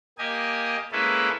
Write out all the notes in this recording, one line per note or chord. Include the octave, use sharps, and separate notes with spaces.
A#3 G4 D#5 G#5
G#3 A#3 C#4 E4 A4 B4